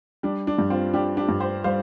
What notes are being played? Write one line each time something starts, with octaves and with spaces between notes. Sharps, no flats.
G3 D4
D4
G2
C4 F4
G3 D4 G4
D4 G4
G2
G4 C5
G3 C5 F5